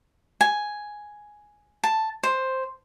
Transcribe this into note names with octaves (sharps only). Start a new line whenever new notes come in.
G#5
A5
C5